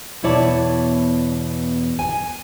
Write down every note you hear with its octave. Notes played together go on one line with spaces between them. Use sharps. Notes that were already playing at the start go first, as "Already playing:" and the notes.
E2 B2 E4 C#5 D5 A5
G#5